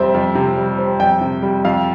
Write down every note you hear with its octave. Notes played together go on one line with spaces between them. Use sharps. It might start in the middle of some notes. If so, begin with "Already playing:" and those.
Already playing: F2 C3 G3 C4 E5
F2
C3
G3
C4
F2 G5
C3
G3
F2 F5